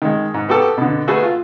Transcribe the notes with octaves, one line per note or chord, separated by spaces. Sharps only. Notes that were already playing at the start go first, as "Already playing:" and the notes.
D#3 G#3
G#2
B3 F#4 G4 A4
B2 D3
A3 F#4 G#4 A4 B4
F4